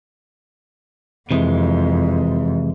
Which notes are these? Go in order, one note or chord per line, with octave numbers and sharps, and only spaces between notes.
F2 C3 E3 G#3